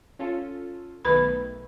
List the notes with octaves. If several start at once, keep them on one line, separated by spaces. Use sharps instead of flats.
C#4 F4 A4
B1 D#3 A3 B4 B5